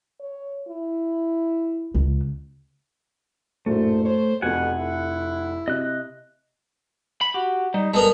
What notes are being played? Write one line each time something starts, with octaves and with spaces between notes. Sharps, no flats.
C#5
E4
C#2
A#1 F#2 A2 A3 C5
C5 C#5
F1 F2 B2 F#5 G#5
E4
C3 D#5 F#6
B5
F#4 G4
G3 D#4
G3 G#3 B3 A4 A#4